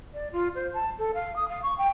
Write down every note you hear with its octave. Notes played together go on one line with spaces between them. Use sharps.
D5
F4
C5
A5
A4
F5
D#6
F5
C#6
G5